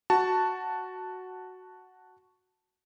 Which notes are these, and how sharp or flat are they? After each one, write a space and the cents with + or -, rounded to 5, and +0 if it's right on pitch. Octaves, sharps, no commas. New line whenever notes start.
F#4 +0 A5 +0